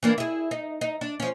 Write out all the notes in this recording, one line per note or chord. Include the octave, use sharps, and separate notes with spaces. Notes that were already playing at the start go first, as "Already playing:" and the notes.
E3 A#3 D4
E4 G#4
D#4
D#4
D4
F3 C#4